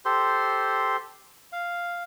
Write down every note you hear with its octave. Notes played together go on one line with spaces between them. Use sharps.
G4 A4 C5 C6
F5